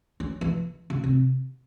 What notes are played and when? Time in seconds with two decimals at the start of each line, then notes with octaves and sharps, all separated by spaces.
0.20 C#4
0.41 E3
0.90 C#3
1.04 C3